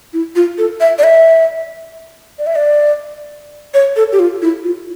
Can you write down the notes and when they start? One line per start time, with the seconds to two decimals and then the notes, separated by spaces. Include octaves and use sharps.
0.13 E4
0.36 F4
0.58 A4
0.81 E5
0.98 D5
1.03 E5
2.39 D5
2.47 E5
2.56 D5
3.74 C#5
3.96 A4
4.12 G4
4.19 F4
4.42 E4
4.64 F4